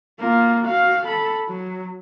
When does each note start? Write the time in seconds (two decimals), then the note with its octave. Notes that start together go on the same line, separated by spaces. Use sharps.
0.19 A#3 F4
0.63 F#4 F5
1.05 A4 B5
1.49 F#3